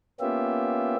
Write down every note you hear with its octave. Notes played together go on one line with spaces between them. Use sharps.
A#3 B3 C#4 F4 G4 E5